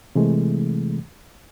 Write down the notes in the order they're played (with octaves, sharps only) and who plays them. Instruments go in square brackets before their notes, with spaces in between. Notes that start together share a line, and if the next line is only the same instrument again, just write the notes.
[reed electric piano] C3 E3 G#3 A3